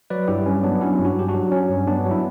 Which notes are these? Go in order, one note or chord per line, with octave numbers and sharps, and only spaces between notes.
F#3 B4 D5
G2 E4 G4
G2 C#4
F#3 B3 D4
F#3 C#4 E4
G2
D4 F#4
G2 G4
D4 F#4
F#3
F#3 C#4
G2
G2 B3 D4
F#3
E4